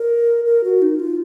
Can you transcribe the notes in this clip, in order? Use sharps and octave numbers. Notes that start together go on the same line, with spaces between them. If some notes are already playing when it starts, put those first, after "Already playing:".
Already playing: A#4
A#4
F#4
D#4
F4